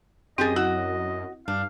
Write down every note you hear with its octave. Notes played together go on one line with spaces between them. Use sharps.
F#2 C4 G4 G#4 D#5 G6 A6
F#2 E4 F#4 F#5
G2 D4 F5